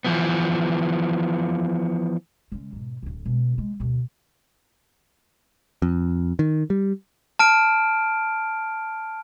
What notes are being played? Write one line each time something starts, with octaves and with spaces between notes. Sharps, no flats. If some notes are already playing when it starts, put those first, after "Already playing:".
E3 F3 B3
C#3 G#3
G#2 B2
D1 D2
B2 G#3
G#3 A#3
D2 B2
F2
D#3
G3
A5 F6 D7